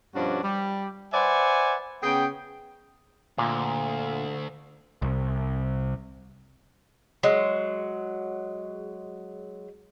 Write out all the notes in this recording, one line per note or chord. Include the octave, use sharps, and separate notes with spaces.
G2 B2 F3 C#4 D4 F#4
G3
B4 C5 D5 E5 F#5 G#5
C#3 B3 G#4 G5
D2 A#2
C2
F#3 G#3